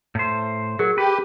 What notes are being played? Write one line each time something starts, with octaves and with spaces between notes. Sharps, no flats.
A2 C5
F#3 G#4 A#4
G4 B4